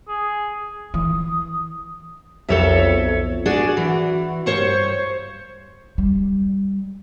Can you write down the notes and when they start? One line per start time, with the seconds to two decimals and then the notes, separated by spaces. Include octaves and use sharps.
0.08 G#4
0.94 E3 D#6
2.49 B1 F2 A4 C#5 E5
3.46 D4 F#4 G#4 D5
3.77 E3
4.46 G2 C5 C#5 C#6
5.98 G3